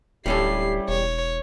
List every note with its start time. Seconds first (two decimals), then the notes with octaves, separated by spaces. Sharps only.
0.26 D1 G3 C#4 E4 G4 A4 C7
0.88 E1 C#5